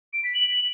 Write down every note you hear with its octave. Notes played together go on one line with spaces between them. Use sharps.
D7
B6
F#7